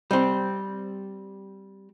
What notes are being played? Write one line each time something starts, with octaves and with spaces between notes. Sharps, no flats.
G3 C4